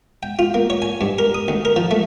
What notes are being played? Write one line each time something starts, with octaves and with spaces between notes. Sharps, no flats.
G5
F4
A#3
C#5
G#5
G2
A#4
D#6
D2
A#4
F3
A3